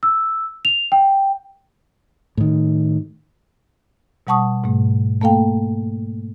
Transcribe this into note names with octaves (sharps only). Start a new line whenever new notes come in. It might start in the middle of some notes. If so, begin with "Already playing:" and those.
E6
F7
G5
A2 D#3
B2 G3 F#5 A5 C#6 D#6
G#2 B2 A3
A3 A#3 A4 F5 G5